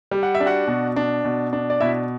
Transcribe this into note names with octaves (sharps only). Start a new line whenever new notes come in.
G3
F#5
E5
D4
F#4 F#5
B2
D4
B2
D4
D5
B2 E4 E5